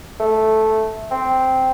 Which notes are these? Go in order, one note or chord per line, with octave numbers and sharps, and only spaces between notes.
A3
C4